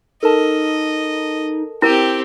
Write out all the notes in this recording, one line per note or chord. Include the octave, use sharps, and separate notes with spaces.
D#4 A4 A#4 D#5 A5
C4 E4 G4 A#4